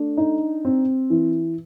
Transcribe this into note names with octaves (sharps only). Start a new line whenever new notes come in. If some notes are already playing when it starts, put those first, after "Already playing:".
Already playing: A3 D4
D#4
C4
E3